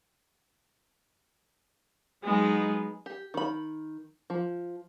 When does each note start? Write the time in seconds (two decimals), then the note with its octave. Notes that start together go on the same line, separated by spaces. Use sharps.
2.22 F#3 G#3 B3 D#4
3.06 G4
3.34 D#3 B5
4.30 F3